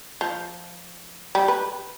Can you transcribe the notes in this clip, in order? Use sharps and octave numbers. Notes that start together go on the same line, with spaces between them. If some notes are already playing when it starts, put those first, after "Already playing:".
F3
G3
B4